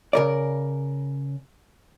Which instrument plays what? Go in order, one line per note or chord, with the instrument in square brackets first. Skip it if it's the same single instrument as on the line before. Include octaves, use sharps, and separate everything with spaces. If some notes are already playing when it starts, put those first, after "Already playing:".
[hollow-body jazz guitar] C#3 A#4 D5